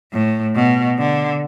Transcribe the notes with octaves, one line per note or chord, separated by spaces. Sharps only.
A2
B2
D3